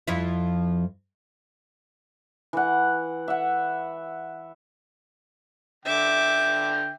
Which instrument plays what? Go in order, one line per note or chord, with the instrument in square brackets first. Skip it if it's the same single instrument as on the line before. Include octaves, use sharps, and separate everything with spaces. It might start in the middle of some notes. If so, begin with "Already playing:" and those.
[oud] F2 F3 E4
[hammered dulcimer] E3 F#5
E5 F#5
[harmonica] D3 G5 [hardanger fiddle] E5 D6